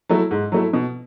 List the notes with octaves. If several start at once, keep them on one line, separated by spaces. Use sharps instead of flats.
F#3 A3 E4
G#2
F#3 A3 E4
B2